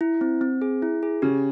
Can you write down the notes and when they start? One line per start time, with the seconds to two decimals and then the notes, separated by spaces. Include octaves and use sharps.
0.01 E4
0.21 C4
0.41 C4
0.62 G#4
0.82 E4
1.03 G#4
1.22 C#3 G4